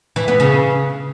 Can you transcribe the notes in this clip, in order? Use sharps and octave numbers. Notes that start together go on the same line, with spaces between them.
E3
B3
C#3